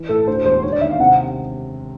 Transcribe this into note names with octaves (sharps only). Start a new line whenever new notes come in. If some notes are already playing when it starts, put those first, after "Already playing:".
Already playing: E3
A2 A4
D2 C5
E1 C5
D3 C#5
D5
D#2 E5
F5
C3 F#5